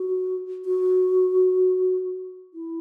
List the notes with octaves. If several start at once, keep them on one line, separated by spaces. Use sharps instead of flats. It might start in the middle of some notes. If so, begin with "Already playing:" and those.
Already playing: F#4
F#4
E4